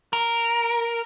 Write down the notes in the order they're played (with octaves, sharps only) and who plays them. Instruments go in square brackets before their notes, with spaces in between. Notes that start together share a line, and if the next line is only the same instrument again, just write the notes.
[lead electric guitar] A#4